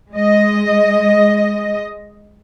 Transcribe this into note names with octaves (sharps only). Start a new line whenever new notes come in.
G#3 D#5